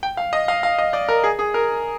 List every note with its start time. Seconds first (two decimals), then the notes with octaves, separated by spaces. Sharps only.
0.03 G5
0.17 F5
0.33 D#5
0.48 F5
0.63 F5
0.78 D#5
0.93 D5
1.08 A#4
1.24 G#4
1.39 G#4
1.54 A#4